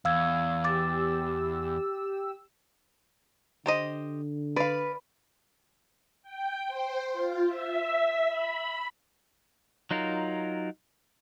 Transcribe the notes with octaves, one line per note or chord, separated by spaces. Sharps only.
E2 F5 E6 G#6
G4 D6 E6 A6
D3 G4 C5 D#5
B4 D5 F5
G5
C5
F4
E5
B5
F#3 D#4 F4 A#4